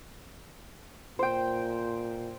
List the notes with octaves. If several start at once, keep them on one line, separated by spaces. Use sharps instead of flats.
A#2 C5 G5